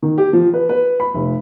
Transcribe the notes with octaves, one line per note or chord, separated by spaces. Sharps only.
D#3
G4
F3
B4
B4
B5
F1